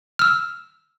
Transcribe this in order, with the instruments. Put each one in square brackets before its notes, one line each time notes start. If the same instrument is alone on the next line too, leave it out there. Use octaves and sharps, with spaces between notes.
[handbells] E6 F6